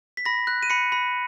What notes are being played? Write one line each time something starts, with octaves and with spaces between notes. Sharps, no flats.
B6
B5 A#6
F#6
D#7
B5 C#7
B5